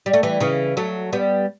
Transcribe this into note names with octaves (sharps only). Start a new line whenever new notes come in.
G3
A3
E3 G3
C#3 E3
F#3 A3
G3 B3